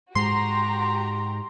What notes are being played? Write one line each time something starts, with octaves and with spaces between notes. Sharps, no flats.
G#2 G#3 F#4 G4 A#5 C6